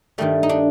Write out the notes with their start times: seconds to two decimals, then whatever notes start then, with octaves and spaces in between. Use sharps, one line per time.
0.18 G2 D#3 G3 A3
0.43 D#4
0.49 D4